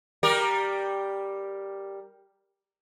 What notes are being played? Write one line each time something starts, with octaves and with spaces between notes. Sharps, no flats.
G3 G4 A#4